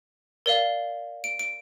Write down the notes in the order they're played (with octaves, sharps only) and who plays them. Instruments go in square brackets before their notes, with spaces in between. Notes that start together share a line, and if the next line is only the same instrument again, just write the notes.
[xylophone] A#4 D5 F5
D7
D7